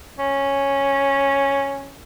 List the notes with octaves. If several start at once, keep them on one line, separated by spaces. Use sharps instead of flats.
C#4